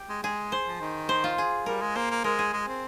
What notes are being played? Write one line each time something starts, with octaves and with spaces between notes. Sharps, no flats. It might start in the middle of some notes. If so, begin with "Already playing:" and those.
Already playing: G4
G#3
G#3 G#4
C5
F3
D#3
C5
F4
G#4
G3 A#4
G#3
A#3 C5
A#3
G#3 A#4
G#4
G#3
C4